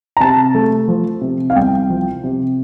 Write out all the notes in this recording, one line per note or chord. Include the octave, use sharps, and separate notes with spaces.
A#5
C3 A5
A3
F3
C3
F5
C2 G5
F3
C3